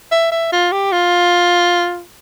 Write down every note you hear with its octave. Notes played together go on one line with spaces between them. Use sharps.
E5
E5
F4
G4
F4